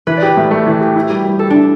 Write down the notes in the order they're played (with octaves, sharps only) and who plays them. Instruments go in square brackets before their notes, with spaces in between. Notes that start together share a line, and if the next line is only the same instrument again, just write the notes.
[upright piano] E3 [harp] B4
[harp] D5
[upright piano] G4 [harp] B4
[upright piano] A2
A3
E3
G4
E4
G3
G3
[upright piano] G4 [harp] A4
[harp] D4 [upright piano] E4